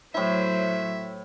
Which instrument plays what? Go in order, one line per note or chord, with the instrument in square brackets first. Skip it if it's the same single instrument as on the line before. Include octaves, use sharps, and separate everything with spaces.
[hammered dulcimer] A2 E4 [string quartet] F#3 [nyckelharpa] C5 [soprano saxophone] E5